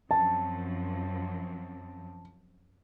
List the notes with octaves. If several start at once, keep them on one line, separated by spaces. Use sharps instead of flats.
F#2 F3 C4 A5